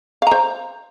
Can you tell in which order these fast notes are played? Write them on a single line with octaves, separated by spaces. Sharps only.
F5 A#5 C5